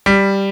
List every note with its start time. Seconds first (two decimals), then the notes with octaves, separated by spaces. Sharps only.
0.06 G3